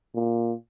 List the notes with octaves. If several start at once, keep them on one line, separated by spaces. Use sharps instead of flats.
A#2